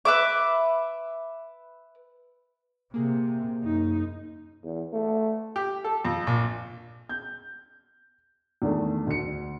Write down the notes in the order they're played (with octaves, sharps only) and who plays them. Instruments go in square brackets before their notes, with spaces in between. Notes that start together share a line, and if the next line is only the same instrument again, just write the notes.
[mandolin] B4 E5 D6
[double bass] C3 [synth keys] A#3 G#4
[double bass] F#2 D#4
[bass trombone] E2
A3
[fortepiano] G4
A4
F2
A#1
[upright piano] G6
E2 D3 D#3 A3
D2 C#7